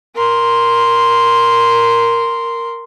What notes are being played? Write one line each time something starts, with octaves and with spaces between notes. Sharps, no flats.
A#4 C6